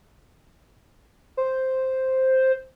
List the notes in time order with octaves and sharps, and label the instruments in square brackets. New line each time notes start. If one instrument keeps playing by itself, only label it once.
[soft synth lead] C5